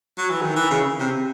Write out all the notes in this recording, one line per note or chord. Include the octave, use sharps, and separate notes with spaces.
F#3
E3
D#3
E3
C#3
C3